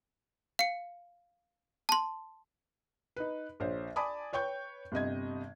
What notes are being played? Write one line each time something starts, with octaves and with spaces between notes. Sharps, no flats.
F5 C#7
A5 C6
D#4 B4
A#1 C5 C#5
D5 G#5 A5 B5 D6 D#6
B4 C#5 G5 C#6 G6
G1 C3 D#5 G#6